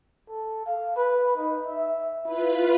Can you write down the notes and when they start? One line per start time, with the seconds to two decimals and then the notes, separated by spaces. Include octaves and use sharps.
0.28 A4
0.66 F5
0.96 B4
1.36 D#4
1.66 E5
2.25 E4 F4 B4